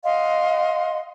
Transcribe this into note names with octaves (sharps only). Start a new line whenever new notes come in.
D#5 F5 F#5 C6